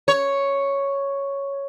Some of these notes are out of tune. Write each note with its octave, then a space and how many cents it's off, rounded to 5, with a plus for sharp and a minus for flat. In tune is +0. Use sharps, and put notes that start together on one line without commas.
C#5 +0